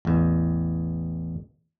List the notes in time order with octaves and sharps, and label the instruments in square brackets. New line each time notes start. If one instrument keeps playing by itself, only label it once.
[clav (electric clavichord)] A1 E2